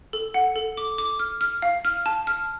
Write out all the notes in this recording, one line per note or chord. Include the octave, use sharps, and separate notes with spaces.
A4
F#5
A4
D6
D6
F6
F6
F5
F6
A5
F6